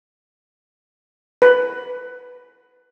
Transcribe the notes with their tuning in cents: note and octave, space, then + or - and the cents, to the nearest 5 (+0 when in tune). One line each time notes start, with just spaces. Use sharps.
B4 +5